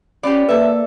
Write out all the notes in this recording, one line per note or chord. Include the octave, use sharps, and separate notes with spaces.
B3 C#4 F4 G4 D5
A#3 A4 B4 E5